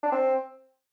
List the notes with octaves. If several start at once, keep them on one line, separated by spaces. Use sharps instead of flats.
D4
C4